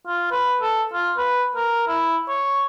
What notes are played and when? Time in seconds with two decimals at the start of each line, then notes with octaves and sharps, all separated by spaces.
0.07 F4
0.32 B4
0.62 A4
0.93 F4
1.18 B4
1.56 A#4
1.88 E4
2.29 C#5